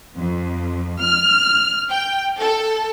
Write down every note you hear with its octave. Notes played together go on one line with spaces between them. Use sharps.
F2
F6
G5
A4